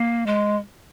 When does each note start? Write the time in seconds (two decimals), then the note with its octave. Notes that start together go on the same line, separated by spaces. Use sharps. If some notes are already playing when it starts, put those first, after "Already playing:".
Already playing: A#3
0.26 G#3